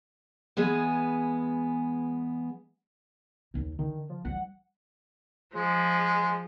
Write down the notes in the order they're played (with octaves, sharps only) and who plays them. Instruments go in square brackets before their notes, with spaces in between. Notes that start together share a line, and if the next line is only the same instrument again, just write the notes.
[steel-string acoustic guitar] E3 G#3 B3 G#4 G#5
[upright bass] D#2 D#3
[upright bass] D3 [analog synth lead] D#3
[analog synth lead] F3
[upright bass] E3 G3 [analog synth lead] F#5
[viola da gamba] F3 [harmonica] G#3